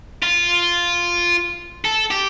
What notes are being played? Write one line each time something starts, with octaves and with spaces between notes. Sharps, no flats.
F4
A4
G4